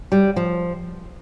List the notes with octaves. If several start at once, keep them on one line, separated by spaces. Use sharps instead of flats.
G3
F3